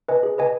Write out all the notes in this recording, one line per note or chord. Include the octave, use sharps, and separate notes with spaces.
B4 D#5 G#5
G#4
B4 D#5 G#5